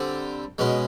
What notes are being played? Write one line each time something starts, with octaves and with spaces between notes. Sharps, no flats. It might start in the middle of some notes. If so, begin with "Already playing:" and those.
Already playing: D3 G3 C4
B2 G#3 C#4